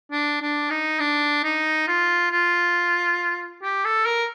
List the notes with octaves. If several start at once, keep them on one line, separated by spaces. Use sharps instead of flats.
D4
D4
D#4
D4
D#4
F4
F4
G4
A4
A#4